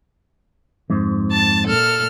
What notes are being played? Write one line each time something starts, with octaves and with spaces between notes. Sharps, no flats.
F2 G#2
A5 A6
A#2 A4 F6